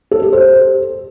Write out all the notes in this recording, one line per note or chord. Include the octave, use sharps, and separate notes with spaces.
A4
G4
C5